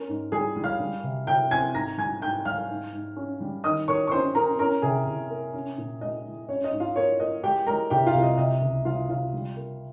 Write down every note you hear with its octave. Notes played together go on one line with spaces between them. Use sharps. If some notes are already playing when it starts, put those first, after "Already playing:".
Already playing: C#4 A#4
G#2
G3 G#4 G#5
G3
F5 F6
G3
C3
C3 G5 G6
C4 G#5 G#6
G#2 A#5 A#6
G3 G#5 G#6
G#2 G5 G6
G3 F5 F6
G#2
G#2
C#4
G3
D#3 D#5 D#6
A#3 C#5 C#6
C#6
C#4 C5 C6
C#4 A#4 A#5
C#4 A#4 A#5
C3 G#4 G#5
C3
A#3
C#4
A#2
G#3 D#5
G#3
C#4 C#5
D#5
G#2
F4 F5
A#3 C#5
A#3 D#5
G#3 G4 G5
G#3 A#4 A#5
C3 G4 G5
F4 F5
C2
D#5
C3 D#5
C#2
G3 F4 F5
C3 F4 F5
G3
A#3